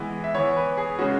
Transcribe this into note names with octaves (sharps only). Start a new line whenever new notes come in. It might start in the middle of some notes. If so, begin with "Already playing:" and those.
Already playing: E3 G#3 B3
E5
E3 B3 C#5
B4
G#4
C#3 G#3 C#4 F#4